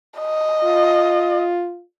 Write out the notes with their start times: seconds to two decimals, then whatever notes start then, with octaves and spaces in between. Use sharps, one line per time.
0.19 D#5
0.64 F4